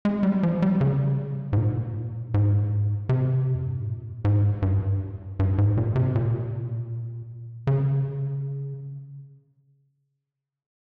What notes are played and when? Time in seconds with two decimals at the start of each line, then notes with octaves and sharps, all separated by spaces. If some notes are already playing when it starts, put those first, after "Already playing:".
0.05 G#3
0.23 G3
0.43 F3
0.62 G3
0.81 C#3
1.53 G#2
1.58 A#2
2.34 G#2
3.09 C3
3.55 F2
3.65 G2
3.76 G#2
3.86 A#2
4.25 G#2
4.62 G2
5.39 G2
5.58 G#2
5.77 A#2
5.96 C3
6.15 A#2
7.67 C#3